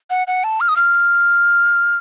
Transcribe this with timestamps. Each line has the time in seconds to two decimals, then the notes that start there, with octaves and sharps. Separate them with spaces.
0.10 F#5
0.27 F#5
0.44 A5
0.61 F6
0.69 D#6
0.77 F6